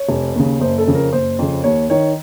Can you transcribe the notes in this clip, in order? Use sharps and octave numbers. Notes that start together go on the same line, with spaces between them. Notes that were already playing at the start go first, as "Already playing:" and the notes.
Already playing: C#5
F1
D#2 C#3
F#1 C5
A4
F2 C#3
A#4
F#1 C5
F2 C#3
D#2 C#5
D#3 C#5